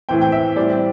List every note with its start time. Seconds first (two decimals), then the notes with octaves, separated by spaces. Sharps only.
0.09 A2 E3 C4 G5
0.21 G5
0.32 E5
0.56 A2 G3 C4 D5